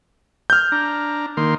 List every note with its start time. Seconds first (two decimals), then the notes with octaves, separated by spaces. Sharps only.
0.50 F6 G6
0.72 D4 A#5
1.37 D#3 A#3 C6